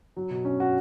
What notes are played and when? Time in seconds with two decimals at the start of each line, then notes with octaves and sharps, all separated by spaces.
0.16 F#3
0.31 B2
0.45 C#4
0.60 F#4